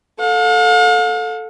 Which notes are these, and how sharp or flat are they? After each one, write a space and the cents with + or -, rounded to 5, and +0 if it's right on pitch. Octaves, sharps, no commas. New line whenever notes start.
A4 +0 F5 +40